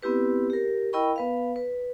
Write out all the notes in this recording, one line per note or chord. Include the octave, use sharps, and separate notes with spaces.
B3 C4 E4 G4 B4
G4 A#4
E4 A#4 D#5 G5 B5 C#6
B3 B4 F5
B4